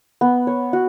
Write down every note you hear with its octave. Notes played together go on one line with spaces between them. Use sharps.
B3
C#5
F#4